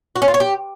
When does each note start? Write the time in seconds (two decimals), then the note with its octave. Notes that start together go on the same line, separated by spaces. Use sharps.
0.16 F#4
0.22 C#4
0.28 F4
0.34 C#5
0.40 G4